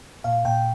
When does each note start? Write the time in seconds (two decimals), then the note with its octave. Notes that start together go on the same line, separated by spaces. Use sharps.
0.24 A#2 F5
0.45 A#2 G5